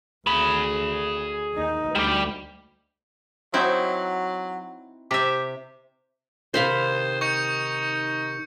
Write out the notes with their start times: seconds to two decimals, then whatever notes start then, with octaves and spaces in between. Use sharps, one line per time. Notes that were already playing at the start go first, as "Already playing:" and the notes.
0.27 D2 G#4 B5
1.55 D#2 D#4
1.95 D2 G3 G4
3.54 F#3 C4 D#4 E4
5.11 C3 G4 E5
6.54 C3 D#3 C5 F5 B5 C6
7.21 D#4 C#6 G6 C#7